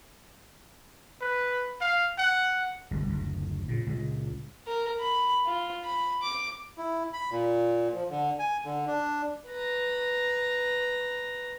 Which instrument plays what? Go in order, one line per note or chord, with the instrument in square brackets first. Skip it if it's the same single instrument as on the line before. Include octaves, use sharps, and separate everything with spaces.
[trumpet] B4
F5
F#5
[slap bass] G1 C2
F#1 D2
A#2 C#3
C#2 A#2 C#3
[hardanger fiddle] A#4
B5
F4
B5
D6
[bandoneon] E4
B5
A#2
F3
D3
G#5
D3
D4
[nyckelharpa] B4 A#5